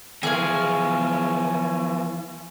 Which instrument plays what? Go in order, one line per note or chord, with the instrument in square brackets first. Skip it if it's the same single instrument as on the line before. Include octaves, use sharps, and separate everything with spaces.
[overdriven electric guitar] E3 F3 [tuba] B3 [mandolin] G#4 F5 [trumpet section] C#5 G#5